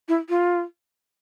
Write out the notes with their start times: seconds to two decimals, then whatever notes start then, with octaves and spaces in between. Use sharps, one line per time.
0.08 E4
0.29 F4